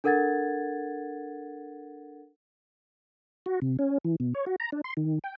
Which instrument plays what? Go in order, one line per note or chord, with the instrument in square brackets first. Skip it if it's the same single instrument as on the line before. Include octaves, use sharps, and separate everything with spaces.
[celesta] D4 A4 A#4 F#5 G#6 A6
[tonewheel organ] F#4
C3
C#4
E3
B2
C#5
F#4
A#5
D4
C6
D#3
G5